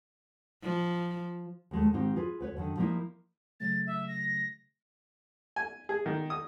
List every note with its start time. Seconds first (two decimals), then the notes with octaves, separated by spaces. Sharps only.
0.62 F3
1.71 D#2 G#3 A3
1.93 G#2 D#3 C4 D#4 G4
2.16 F4 G#4 B4
2.40 D2 B4 C#5
2.57 F#2 D3 D#3
2.77 F3 G3 A#3 D#4 E4
3.60 C#3 F#3 A3 A6
3.87 E5
4.08 A#6
5.56 G#5
5.89 G#4
6.06 D#3
6.30 D#6